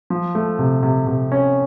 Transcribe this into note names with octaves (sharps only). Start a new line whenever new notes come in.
F3
A3
C3
C3
C3
C#4